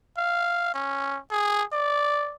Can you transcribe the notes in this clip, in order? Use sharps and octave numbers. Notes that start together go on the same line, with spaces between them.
F5
C#4
G#4
D5